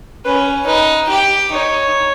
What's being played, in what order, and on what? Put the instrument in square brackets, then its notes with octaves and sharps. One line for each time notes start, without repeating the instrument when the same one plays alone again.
[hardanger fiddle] C#4 [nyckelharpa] B4
[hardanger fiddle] D#4 [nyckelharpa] B4
[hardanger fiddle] G4
[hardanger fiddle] D#4 [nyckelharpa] C#5